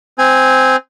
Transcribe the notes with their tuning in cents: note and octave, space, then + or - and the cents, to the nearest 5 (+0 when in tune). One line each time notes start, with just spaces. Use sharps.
C4 -10 G#5 -10